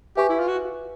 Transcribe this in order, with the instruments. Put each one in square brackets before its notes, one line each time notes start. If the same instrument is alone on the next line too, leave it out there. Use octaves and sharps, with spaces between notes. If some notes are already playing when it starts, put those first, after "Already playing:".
[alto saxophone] G4 [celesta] B4 E5 G#5 C#6
[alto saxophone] E4
F4
F#4